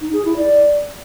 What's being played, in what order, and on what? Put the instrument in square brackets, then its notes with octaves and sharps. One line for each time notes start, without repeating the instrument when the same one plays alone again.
[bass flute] D#4
G#4
E4
D5